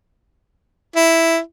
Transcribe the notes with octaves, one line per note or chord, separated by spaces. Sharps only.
E4